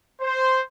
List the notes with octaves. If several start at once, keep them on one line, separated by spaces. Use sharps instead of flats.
C5